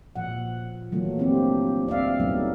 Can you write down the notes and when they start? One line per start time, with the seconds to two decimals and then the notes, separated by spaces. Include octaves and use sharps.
0.16 A#2 F3 F#5
0.92 E3 F#3 A3 A#3 F4
1.18 A3 A#3 C4 D4 E4 G4
1.87 C4 D5 E5 F5
2.20 F#3 G3 A3 B3 D#4